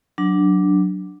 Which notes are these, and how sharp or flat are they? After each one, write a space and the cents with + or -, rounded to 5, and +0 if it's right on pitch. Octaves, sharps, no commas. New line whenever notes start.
F#3 +0 D4 +0